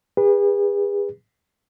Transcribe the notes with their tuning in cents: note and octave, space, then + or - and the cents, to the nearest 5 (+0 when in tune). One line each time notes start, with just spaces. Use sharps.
G#4 -45 B4 -20